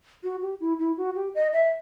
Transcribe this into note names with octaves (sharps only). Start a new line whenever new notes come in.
F#4
G4
E4
E4
F#4
G4
D#5
E5